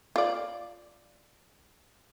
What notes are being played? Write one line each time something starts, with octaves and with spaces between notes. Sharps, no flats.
F4 D5